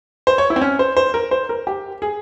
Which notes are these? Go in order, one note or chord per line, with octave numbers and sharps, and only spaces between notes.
C5
C#5
E4
C4
C#4
C5
C5
A#4
C5
A#4
G4
G#4